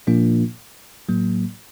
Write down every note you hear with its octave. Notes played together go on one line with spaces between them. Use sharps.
A#2 F3 A#3 D4 F4
A2 F#3 A#3